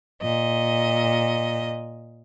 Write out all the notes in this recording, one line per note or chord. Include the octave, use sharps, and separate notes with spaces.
A#2 D#5